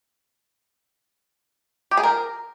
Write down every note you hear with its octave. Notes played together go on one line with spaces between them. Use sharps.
G4
G#4
A#4